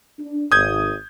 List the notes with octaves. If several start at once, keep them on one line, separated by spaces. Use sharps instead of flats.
D4
G#1 D#6 G6 G#6